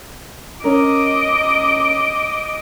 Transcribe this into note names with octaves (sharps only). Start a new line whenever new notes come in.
C#4 A#4 D#5 D6